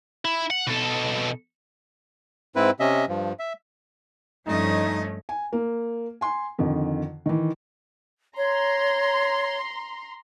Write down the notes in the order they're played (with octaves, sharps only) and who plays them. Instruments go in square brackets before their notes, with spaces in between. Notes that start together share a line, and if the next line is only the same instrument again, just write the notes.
[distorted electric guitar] E4
F#5
B2 A4
[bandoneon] G#2 C4 E4 B4
C3 C#4 D#5 E5
G2 F3
E5
[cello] G2 D#5 [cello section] F3 A3 C#4 [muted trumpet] D#4
[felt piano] G#5
A#3
G#5 C6
F2 D3 D#3
D#3 E3
[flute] C#5 [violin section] A#5 C6